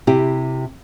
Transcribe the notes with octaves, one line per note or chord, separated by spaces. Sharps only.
C3 E4 G4